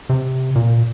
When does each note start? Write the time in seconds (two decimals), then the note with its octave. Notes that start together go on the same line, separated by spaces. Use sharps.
0.09 C3
0.55 A#2